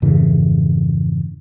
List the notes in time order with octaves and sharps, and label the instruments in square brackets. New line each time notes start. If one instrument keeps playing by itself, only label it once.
[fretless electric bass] F2 G#2 C#3 E3